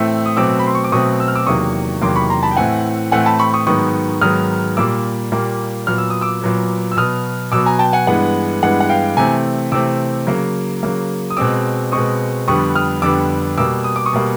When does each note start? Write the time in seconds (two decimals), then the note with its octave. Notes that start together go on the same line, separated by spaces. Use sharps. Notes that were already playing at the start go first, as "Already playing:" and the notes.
Already playing: A2 E3 A3 C4 E6
0.26 D#6
0.37 B2 F#3 A3 C4 D6 E6
0.59 B5
0.67 C6
0.75 C#6
0.84 D6
0.92 B2 F#3 A3 C4 C#6 D#6
1.20 E6
1.28 F6
1.35 D6 E6
1.47 E2 C3 D#3 F#3 A#3 C#6 D#6
2.02 E2 C3 D#3 F#3 A#3 C6 D6
2.16 B5 C#6
2.30 A#5 C6
2.43 A5 B5
2.51 G5
2.56 A2 E3 A3 C4 F#5 G#5
3.11 A2 E3 A3 C4 F#5 G#5
3.26 A5 B5
3.39 B5 C#6
3.54 C#6 D#6
3.67 G#2 D#3 F#3 B3 C#6 D#6
4.21 G#2 D#3 F#3 B3 D#6 F6
4.77 A#2 G3 A#3 D6 E6
5.32 A#2 G3 A#3
5.87 A#2 F#3 B3 F6
5.98 E6
6.10 D#6
6.21 D6 E6
6.42 A#2 F#3 B3
6.92 E6
6.97 B2 F#3 B3 D#6 F6
7.52 B2 F#3 B3 D6 E6
7.66 G#5 A#5
7.79 G5 A5
7.93 F#5 G#5
8.07 G2 E3 G#3 B3 F#5
8.63 G2 E3 G#3 B3 F#5
8.80 F#5
8.89 F5 G5
9.17 C3 E3 A3 C4 G#5 A#5
9.72 C3 E3 A3 C4 D6 E6
10.27 C#3 F#3 A#3
10.83 C#3 F#3 A#3
11.30 D#6
11.37 B2 G#3 C4 D6 E6
11.92 B2 G#3 C4 C#6 D#6
12.47 F2 D3 G3 B3 C#6 D#6
12.75 D#6 F6
13.02 F2 D3 G3 B3 D6 E6
13.58 B2 G3 A#3 D6 E6
13.84 D#6
13.96 D6
14.06 C#6 D#6
14.13 B2 G3 A#3